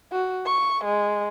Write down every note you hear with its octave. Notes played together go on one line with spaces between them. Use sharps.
F#4
C#6
G#3